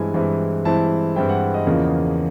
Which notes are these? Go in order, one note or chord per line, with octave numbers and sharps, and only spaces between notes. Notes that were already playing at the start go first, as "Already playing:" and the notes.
Already playing: G2 E3 G#3 C4 E4 G#5
G2 E3 G#3 C4 E4
G2 E3 G#3 C4 E4 A5
G2 E3 G#3 C4 E4 G5
F#5
D#5
E2 C#3 F3 A#3